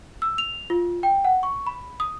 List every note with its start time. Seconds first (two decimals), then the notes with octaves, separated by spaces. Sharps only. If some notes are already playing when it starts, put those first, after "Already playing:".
0.22 E6
0.38 F7
0.70 F4
1.03 G5
1.24 F#5
1.43 C#6
1.67 B5
2.00 D#6